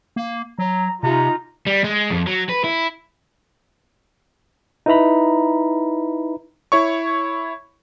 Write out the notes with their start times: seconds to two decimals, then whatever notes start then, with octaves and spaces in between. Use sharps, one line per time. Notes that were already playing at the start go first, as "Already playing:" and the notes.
0.16 A#3
0.59 F#3 A#5
1.03 C3 D#4 F4 A#5
1.67 G3
1.84 G#3
2.10 F2
2.27 F#3
2.49 B4
2.64 E4
4.86 D#4 E4 B4 E5 A#5 B5
6.72 E4 C#5 C#6